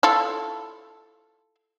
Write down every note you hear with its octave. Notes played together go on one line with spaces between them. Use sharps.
E4 F4 A4